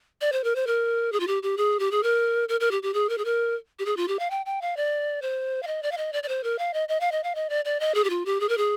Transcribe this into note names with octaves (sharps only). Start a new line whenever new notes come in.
D5
C5
A#4
C5
A#4
G#4
F4
G4
G4
G#4
G4
G#4
A#4
A#4
A#4
G4
G4
G#4
A#4
G#4
A#4
G4
G#4
F4
G4
F5
G5
G5
F5
D5
C5
F5
D#5
D5
F5
D#5
D5
D5
C5
A#4
F5
D#5
D#5
F5
D#5
F5
D#5
D5
D5
D#5
G#4
G4
F4
G4
G#4
A#4
G#4